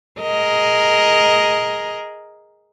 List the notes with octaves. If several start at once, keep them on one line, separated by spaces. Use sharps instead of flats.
G#4 A#4 D#5